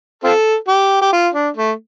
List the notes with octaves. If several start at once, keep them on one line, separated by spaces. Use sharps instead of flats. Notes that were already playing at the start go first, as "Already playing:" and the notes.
C4 F4 A4
G4
G4
F4
D4
A3